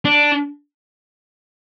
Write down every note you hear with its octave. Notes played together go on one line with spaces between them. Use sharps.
D4